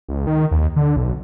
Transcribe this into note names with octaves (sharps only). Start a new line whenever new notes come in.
C#2
D#3
D#2
D3
B1